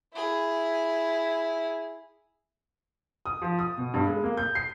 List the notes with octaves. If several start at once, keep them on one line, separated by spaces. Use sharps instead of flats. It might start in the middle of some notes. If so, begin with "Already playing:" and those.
E4 G#4
D#6
F3
D#6
B2
G2
G#3
A#3
G6
C7